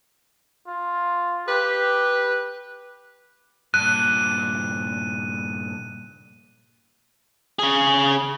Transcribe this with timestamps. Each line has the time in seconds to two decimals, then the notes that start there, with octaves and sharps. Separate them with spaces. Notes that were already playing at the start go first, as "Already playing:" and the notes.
0.67 F4
1.48 G4 B4
3.74 G2 A#2 F#6 D#7
7.59 C#3 G#4